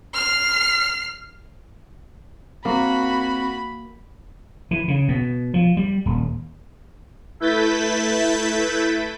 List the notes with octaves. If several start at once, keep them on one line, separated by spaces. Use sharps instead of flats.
F6 C7
A#3 C4 F#4 B5
E3
C#3
B2
F3
G3
D#1
A3 E4 B4 G6 A6 B6